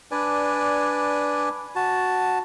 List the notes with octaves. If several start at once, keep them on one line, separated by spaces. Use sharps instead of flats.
D4 B4 D5 G#5
F#4 A5